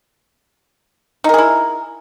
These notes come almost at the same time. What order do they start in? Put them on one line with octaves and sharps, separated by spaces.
D#4 A#4 G#4 E4